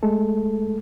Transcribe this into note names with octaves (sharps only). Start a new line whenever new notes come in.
G#3 A3 A4